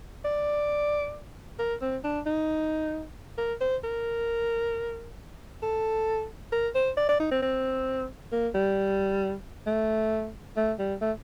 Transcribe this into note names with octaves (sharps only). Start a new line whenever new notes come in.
D5
A#4
C4
D4
D#4
A#4
C5
A#4
A4
A#4
C5
D5
D5
D#4
C4
C4
A#3
G3
A3
A3
G3
A3